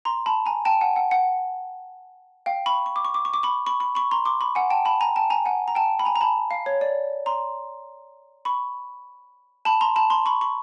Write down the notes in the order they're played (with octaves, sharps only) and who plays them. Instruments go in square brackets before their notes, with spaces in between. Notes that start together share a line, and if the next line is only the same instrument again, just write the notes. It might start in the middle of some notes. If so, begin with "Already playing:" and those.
[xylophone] A#5 C6
A5 B5
G#5 A#5
G5 A5
F#5 G#5
F#5
F#5
F5 G5
B5 C#6
C#6
D6
C#6
D6
C#6
D6
B5 C#6
B5 C#6
B5 C#6
B5 C#6
A#5 C6
C6 D6
B5 C#6
F#5 G#5
G5 A5
A5 B5
G#5 A#5
G5 A5
G#5 A#5
F#5 G#5
A#5
G5 A5
B5
G#5 A#5
A#5
A5 B5
F5
C#5
D5
A#5 C6
B5 C#6
A5 B5
A#5 C6
A5 B5
A#5 C6
B5 C#6
B5 C#6